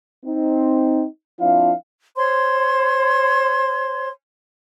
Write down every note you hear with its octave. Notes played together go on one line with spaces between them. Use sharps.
C4 D#4
F3 C4 D4 E4 F4 F5
C5 C#5 C6